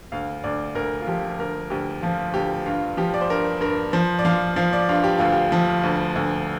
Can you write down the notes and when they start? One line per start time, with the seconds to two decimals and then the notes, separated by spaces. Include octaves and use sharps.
0.12 D2 F5
0.44 D2 D5
0.75 D2 A#4
1.01 F4
1.07 F3 G4
1.38 D2 A#4
1.70 D2 G4
2.02 F3 F4
2.34 D2 G4
2.66 G2 F4
2.97 F3 G4
3.14 D5
3.21 C5
3.29 G2 A#4
3.61 G2 A#4
3.93 F3 C5
4.19 D5
4.25 F3 F5
4.56 F3 F5
4.73 D5
4.89 G2 F4
5.04 G4
5.18 D2 F4
5.32 G4
5.52 F3
5.83 D2
6.16 D2